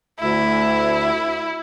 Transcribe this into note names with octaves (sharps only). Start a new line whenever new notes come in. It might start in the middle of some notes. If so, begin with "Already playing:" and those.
D2 E4